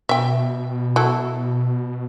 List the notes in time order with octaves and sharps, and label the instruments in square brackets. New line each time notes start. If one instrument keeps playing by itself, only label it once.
[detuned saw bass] B2 [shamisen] E5 G5
[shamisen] F#3 E4 A4